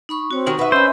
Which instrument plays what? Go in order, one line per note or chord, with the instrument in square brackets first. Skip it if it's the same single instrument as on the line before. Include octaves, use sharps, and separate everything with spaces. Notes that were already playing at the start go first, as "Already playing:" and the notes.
[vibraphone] D#4 B5 C#6
[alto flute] C4 [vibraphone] F#4 C#5
[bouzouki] D#3 F#4 G#5 [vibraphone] D#4 C#6
[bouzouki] B4 E5 [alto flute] F#5
[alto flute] C#4 [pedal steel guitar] C5 [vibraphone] D#5 B5